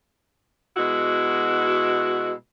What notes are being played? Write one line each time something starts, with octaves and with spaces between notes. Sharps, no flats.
B2 G#3 E4 F#4